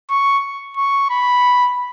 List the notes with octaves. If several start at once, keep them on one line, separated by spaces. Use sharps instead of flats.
C#6
C#6
B5